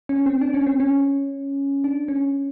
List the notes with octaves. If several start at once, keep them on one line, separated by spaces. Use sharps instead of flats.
C#4
C4
D4
C#4
C4
C#4
D4
C#4